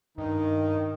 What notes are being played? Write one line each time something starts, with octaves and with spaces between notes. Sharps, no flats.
G2 D#3 D#4